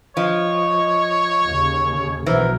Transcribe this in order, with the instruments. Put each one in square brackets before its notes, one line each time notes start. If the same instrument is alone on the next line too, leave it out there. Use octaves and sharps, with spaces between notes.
[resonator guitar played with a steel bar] F3 [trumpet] C#5 [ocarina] D#5
[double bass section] D#2 C#3
[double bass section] B1 F#3 [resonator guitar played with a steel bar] E3 [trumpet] A#4 [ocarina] C5